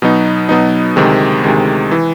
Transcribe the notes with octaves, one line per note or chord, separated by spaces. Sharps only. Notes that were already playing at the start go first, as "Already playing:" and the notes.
B2 F#3 B3 D#4
B2 F#3 B3 D#4
D2 C3 D#3 G#3
D2 C3 D#3 G#3
E3